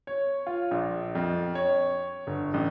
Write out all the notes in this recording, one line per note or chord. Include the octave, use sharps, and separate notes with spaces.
C#5
F4
A#1
F2
C#5
G1
A1